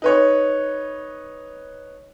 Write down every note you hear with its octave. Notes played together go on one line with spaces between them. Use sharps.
D#4 B4 C#5